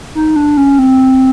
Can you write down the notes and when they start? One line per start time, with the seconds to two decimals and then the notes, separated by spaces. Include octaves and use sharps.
0.15 D#4
0.36 D4
0.57 C#4
0.79 C4